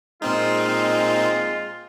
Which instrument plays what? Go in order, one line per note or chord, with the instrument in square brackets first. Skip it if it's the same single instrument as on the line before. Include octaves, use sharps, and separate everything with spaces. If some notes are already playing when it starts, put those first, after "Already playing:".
[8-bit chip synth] A#2 C4 D#4 [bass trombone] G#3 [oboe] F4